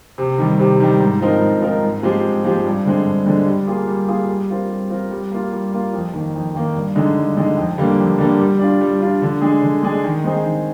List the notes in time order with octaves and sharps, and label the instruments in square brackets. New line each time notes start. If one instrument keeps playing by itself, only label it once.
[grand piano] C3
D#3 G3
C3
D#3 G3
G#2
F3 C4 D#4 A#4
G#2
F3 C4 D#4 A#4
G#2
F3 G#3 C4 G4
G#2
F3 G#3 C4 G4
G2
D3 G#3 C4
G2
D3 G#3 C4
G3
A#3 F4 G#4
G3
A#3 F4 G#4
G3
C4 F4 A#4
G3
C4 F4 A#4
G3
A#3 F4
G3
A#3 F4
F2
D#3 A#3
F2
D#3 A#3
G2
D3 G#3 D#4
G2
D3 G#3 D#4
F2
D3 G3 A#3
F2
D3 G3 A#3
G3
D4 F4
G3
D4 F4
D3
G#3 D4 G#4
D3
G#3 D4 G#4
D#3
G#3 C4 D#4 G#4
D#3